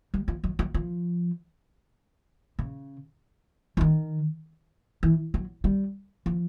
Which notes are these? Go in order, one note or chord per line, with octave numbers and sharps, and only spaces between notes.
G3
F3
F#3
F#3
F3
C#3
E3
D#3
E3
F#3
G3
F3